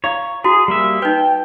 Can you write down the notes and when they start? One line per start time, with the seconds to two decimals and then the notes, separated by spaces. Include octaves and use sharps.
0.04 E4 C#5 F5
0.44 E4 F#4 G#4
0.68 G3 A#3 E5
1.02 D#4 B4 G5